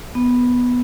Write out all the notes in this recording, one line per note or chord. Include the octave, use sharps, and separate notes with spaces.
B3